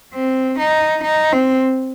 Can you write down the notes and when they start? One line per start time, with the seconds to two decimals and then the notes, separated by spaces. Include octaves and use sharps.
0.14 C4
0.59 D#4
1.03 D#4
1.33 C4